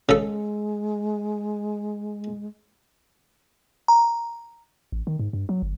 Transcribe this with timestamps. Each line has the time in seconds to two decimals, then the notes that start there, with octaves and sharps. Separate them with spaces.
0.09 C#3 G#3 A4
3.88 A#5
4.92 A1
5.07 D#3
5.19 G#2
5.33 G2
5.49 F#3
5.62 G1